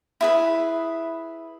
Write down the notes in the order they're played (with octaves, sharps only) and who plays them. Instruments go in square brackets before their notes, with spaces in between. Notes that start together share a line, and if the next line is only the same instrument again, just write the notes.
[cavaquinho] E4 G#4 B4